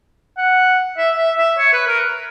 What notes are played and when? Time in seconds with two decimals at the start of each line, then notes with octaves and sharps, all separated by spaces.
0.37 F#5
0.98 E5
1.18 E5
1.38 E5
1.58 C#5
1.73 B4
1.88 A#4